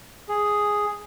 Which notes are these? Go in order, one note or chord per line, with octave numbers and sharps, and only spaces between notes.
G#4